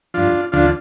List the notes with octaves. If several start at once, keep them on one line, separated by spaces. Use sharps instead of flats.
G2 F3 D4 F4
D2 D3 F3 D4 F4